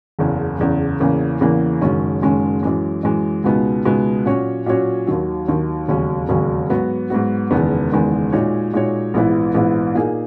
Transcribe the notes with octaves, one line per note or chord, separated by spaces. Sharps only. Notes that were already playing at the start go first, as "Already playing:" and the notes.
F#1 E2 C#3
F#1 E2 C#3
E2 C#3 E3 A#3
E2 C#3 E3 A#3
F#1 F#2 D#3 G#3 C#4
F#1 F#2 D#3 G#3 C#4
F#2 E3 G#3
F#2 E3 G#3
C#2 B2 G#3 B3 D#4
C#2 B2 G#3 B3 D#4
A#2 F#3 C#4 F#4 C#5
A#2 F#3 C#4 F#4 C#5
D#2 D#3 F#3
D#2 D#3 F#3
E1 D#2 C#3 F#3 C#4
E1 D#2 C#3 F#3 C#4
G#2 F#3 B3 F#4
G#2 F#3 B3 F#4
F#1 E2 D#3 G#3 B3
F#1 E2 D#3 G#3 B3
A#2 G#3 D#4 F#4 C#5
A#2 G#3 D#4 F#4 C#5
A#1 G#2 E3 B3 E4
A#1 G#2 E3 B3 E4
A#2 A#3 D#4 G#4